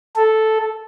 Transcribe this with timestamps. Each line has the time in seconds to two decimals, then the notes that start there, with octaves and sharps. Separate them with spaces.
0.16 A4